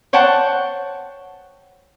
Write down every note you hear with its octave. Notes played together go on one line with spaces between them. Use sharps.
C5 C#5 F#5 G5 A5